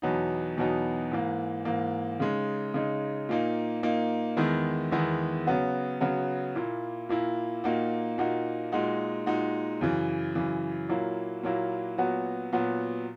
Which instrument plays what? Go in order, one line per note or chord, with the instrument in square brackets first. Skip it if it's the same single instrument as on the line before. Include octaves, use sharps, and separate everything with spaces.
[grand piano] E2 B2 F#3 B3 D#4
E2 B2 F#3 B3 D#4
G#2 E3 A#3
G#2 E3 A#3
C#3 G#3 D#4
C#3 G#3 D#4
A#2 A#3 D#4
A#2 A#3 D#4
E2 D#3 G#3 B3 E4
E2 D#3 G#3 B3 E4
C#3 F#3 B3 F#4
C#3 F#3 B3 F#4
A#2 A#3 E4
A#2 A#3 E4
A#2 A#3 D#4 F#4
A#2 A#3 D#4 F#4
A#2 G#3 D#4 F#4
A#2 G#3 D#4 F#4
F#2 C#3 E3
F#2 C#3 E3
A#2 F#3 A#3 E4
A#2 F#3 A#3 E4
A#2 F#3 B3 F#4
A#2 F#3 B3 F#4